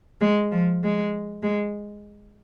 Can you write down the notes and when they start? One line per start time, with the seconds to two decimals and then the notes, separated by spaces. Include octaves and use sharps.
0.20 G#3
0.51 F3
0.82 G#3
1.42 G#3